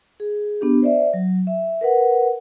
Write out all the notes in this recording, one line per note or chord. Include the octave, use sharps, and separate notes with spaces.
G#4
B3 D4 G4
C5 D5 E5
F#3
E5
A#4 B4 F#5